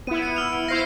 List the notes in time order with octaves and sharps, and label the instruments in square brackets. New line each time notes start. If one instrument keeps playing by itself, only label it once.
[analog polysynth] B3 E4 [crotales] D#7
[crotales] C#7 D#7
E6 F6 F7
D7
[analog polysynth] E4 C5 F5 [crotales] A#6 C7